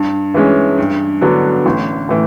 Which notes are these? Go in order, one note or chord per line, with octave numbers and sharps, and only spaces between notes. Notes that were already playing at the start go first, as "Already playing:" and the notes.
Already playing: G2
E3 G#3 C#4
G2
D3 F#3 B3 D4
A1
A2 E3